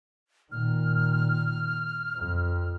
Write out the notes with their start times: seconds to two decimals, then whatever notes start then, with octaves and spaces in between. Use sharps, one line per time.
0.52 A#2 D#3 F6
2.17 F2